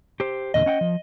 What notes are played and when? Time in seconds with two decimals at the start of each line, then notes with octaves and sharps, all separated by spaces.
0.20 G4 C5
0.54 E2 A#2 D3 D#5
0.66 C#4 F#5 G5
0.81 F3